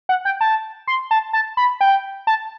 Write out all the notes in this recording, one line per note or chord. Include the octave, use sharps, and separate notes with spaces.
F#5
G5
A5
C6
A5
A5
B5
G5
A5